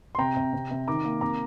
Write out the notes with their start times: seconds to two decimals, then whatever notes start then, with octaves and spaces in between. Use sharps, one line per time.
0.15 C6
0.18 C3 G5 A#5
0.36 C3
0.53 C3
0.71 C3
0.87 D#3 A#5 D6
1.05 A#3
1.21 C3 A#5 D6